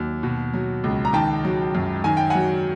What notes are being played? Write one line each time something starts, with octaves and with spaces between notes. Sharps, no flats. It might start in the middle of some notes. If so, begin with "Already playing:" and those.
Already playing: D#2 F#3
B2
F#3
C#2
A#5
D#3 G5 A5
F#3
F#2
D#3 G#5
G5
F#3 F#5 G#5